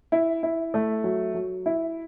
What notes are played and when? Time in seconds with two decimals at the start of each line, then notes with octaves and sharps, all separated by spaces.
0.12 E4
0.43 E4
0.74 A3
1.04 F#3
1.35 F#3
1.66 E4